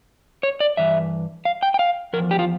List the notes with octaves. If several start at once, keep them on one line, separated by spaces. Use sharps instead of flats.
C#5
D5
G2 E3 E5
F5
G5
G5
F5
E2 C#3 F3 A#4
G4
F4